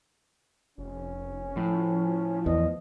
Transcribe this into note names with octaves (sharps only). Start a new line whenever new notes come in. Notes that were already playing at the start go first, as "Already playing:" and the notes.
F1 C#4
A2 F3
E2 D#5